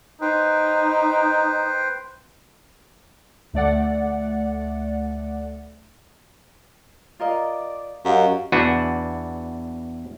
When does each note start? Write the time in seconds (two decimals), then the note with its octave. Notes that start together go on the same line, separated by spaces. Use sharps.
0.21 D#4 B4 C5 G5
3.53 D2 A3 D5 F#5
7.20 F4 A#4 D5 D#5
8.05 F#2 G4 D#5 F5 F#5
8.52 E2 D4 F#4 B4